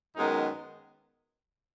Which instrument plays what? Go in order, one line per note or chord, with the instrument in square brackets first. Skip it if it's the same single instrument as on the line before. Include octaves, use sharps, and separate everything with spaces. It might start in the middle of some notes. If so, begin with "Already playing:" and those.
[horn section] F#2 D#3 G#3 B3 D#4